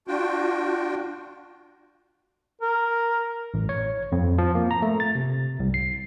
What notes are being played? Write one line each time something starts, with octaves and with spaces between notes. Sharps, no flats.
D4 F4 F#4 G5
A#4
A1
C#5
F2
F3
A#3
A#5
A3
A6
C3
C2
C7